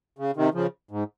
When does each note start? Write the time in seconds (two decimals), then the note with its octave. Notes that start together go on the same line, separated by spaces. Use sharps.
0.19 C#3
0.36 C3 D#3
0.54 C#3 F3
0.91 G#2